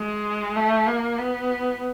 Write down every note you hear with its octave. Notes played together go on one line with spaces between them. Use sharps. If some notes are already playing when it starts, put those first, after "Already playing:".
Already playing: G#3
A3
A#3
B3